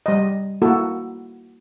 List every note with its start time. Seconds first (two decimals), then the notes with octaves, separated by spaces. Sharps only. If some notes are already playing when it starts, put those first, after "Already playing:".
0.06 G3 D#5
0.62 A#3 E4 F#4 A4